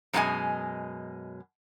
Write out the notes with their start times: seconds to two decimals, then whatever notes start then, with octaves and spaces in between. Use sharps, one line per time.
0.13 F#2 B2 G#3 F4 D#5 G#5